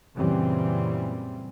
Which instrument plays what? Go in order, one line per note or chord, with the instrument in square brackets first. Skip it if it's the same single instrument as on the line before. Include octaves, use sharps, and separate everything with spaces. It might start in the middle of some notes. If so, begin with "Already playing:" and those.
[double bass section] F#2 A#2 C#3 E3 G3 C4